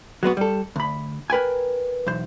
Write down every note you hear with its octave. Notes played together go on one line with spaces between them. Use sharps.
F#3 G#3 B3 F#4
G3 A4
D2 B5
A#4 B4 G5 G#5
B1 E2 C5